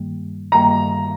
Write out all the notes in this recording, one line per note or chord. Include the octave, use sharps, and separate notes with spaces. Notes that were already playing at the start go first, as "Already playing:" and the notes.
Already playing: G2 D#3 G3 A#3
G2 D#3 G3 A#3 A#5